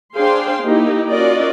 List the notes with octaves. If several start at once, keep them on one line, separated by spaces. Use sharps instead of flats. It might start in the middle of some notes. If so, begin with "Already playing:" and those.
D4 G#4 C5 F5 G5 C6
A#3 D#4 E4 G4
C#4 F4 F#4 A#4 D5 D#5